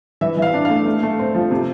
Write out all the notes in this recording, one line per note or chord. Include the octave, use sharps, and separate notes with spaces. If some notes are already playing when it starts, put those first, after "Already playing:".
E3 E5
E3 E5
F5
D4
A3 F5
A3
A3
C4
F3
C3